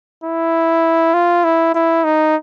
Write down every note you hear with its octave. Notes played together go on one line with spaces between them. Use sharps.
E4
F4
E4
E4
D#4